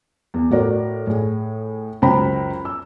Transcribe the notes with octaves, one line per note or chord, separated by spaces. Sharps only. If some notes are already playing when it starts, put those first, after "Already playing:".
E2
A2 F#4 A#4 D5
A2 G#4
C#2 F#2 C5 G5 A#5 B5
E6